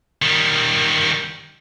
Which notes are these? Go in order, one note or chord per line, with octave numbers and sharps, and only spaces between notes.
D#3 G3